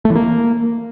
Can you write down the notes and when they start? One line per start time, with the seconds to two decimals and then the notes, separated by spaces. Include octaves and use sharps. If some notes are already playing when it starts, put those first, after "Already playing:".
0.05 A3
0.10 E3
0.15 A#3